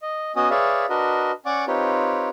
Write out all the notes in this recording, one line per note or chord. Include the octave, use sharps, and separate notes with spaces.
D#5
B3 C#4 F#4 D#5 D#6
G#4 B4 C#5 D5 E5 F5
D4 F#4 A#4 B4 D#5
C#4 D5 F#5 C#6 D6
C4 D#4 F4 G4 B4 C#5